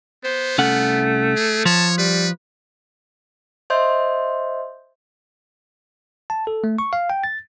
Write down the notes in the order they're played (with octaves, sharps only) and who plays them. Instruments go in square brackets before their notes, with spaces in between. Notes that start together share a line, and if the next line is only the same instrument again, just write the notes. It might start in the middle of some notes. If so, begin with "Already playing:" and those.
[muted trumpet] B3 [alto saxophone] C5
[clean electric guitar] C2 C#4 F#5 [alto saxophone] A3
[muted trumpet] G#4
[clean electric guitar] F3 [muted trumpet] C#5 [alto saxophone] A5
[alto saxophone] G3 [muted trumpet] B4
[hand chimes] C5 D#5 E5 C6 G6
[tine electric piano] A5
A4
A3
C#6
F5
G5
A6